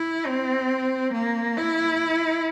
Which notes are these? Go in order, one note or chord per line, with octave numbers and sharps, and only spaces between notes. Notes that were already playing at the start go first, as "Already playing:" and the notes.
Already playing: E4
C4
A#3
E4